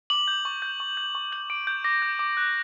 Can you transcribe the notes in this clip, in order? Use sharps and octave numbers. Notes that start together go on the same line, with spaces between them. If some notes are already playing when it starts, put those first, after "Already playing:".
D6 F#7
G6
C#6
G6
C#6
G6
C#6
G6 F#7
D6 D7
G6
D6 A#6
G6
D6
F#6